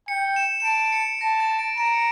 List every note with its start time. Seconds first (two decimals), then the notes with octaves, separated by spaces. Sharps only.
0.08 G5 C#7
0.36 E7
0.60 E7
0.64 A5 D7
0.92 C#7
1.21 A5 A#6
1.40 A6
1.59 D7
1.78 A#5 E7
1.85 D7
1.93 C#7